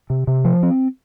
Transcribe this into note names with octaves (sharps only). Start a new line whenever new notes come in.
C3
C3
F3
C4